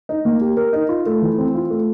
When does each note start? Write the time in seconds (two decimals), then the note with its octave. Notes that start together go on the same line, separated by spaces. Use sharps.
0.09 D#4
0.25 A#3
0.41 G4
0.57 A#4
0.73 D#4
0.89 F4
1.06 A3
1.22 E3
1.38 C4
1.54 F4
1.70 A3